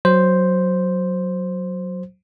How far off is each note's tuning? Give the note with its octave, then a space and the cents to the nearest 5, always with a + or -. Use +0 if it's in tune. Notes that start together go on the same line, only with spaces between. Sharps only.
F#3 +0 C5 +0